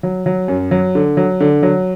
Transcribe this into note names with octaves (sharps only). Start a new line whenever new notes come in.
F#3
F#3
F#2
F#3
D3
F#3
D3
F#3